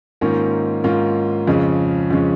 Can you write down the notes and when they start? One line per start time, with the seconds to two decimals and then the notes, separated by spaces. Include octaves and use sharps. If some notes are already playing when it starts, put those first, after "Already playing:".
0.21 G#2 D#3 A#3 C#4 F4
0.84 G#2 D#3 A#3 C#4 F4
1.48 F2 C#3 G#3 C#4
2.11 F2 C#3 G#3 C#4